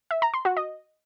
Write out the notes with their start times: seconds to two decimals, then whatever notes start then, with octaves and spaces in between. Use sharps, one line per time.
0.11 E5
0.22 A#5
0.34 C6
0.45 F#4
0.57 D#5